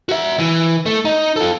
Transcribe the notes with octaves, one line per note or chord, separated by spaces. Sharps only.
F#4 E5
E3
A3
D#4
F4 A4